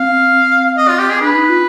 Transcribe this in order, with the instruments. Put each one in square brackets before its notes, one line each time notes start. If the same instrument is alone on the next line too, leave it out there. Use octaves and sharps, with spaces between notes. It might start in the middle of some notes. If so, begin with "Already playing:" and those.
Already playing: [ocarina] C4 [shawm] F5
[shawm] D#5
F4
G4
G#4
[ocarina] D4 [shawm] B4
[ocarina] D#4
F4